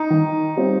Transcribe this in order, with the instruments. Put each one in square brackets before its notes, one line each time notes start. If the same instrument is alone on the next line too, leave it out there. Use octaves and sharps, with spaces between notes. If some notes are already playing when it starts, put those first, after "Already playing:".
Already playing: [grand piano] D#4
[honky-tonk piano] D#3
G3 C4 F4